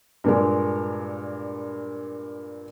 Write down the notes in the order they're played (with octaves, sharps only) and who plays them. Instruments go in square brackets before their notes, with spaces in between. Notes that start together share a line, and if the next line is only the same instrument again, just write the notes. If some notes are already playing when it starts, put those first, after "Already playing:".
[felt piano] G2 A#2 G#3